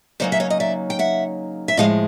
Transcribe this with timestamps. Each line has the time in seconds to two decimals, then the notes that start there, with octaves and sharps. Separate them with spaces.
0.20 C#3 F#3 A#3 D#4 C5 D5
0.32 E5
0.40 C#5 D#5
0.50 D#5
0.60 D5 E5
0.90 G5
0.99 E5 F#5
1.68 E5
1.77 A2 F3 G#3 D#5 F5